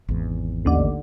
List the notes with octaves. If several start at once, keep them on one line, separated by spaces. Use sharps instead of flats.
G#1 E2
A1 D#2 D3